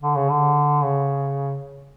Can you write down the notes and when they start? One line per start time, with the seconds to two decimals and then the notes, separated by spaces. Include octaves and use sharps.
0.02 D3
0.16 C#3
0.30 D3
0.84 C#3